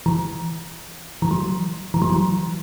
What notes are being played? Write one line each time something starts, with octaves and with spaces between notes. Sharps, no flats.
E3
E3
F#3
E3
F#3
E3